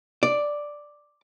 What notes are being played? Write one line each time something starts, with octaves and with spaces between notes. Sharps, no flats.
D5